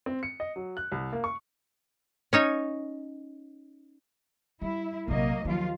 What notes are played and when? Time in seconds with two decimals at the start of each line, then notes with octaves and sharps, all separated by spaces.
0.06 C4
0.23 C#7
0.40 D#5
0.56 F#3
0.77 F#6
0.92 C2
1.13 A#3
1.24 C#6
2.33 C#4 D#4 C#5
4.62 G3 E4
5.08 A#1 C3 F#3 A#3 D#5
5.45 D#2 F3 F#3 F4